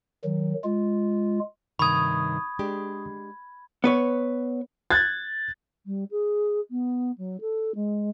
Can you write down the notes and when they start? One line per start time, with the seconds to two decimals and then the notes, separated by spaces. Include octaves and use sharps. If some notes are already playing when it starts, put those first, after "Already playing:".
0.24 D#3 F#3
0.64 G#3 F4
1.79 G2 C3 D#3 B5 C#6 D#6 G#6
2.59 G#3 D4 G4
3.84 B3 B4 C#5
4.91 F#6 G#6 A6
5.86 G3
6.11 G#4
6.70 B3
7.18 F#3
7.41 A4
7.75 G#3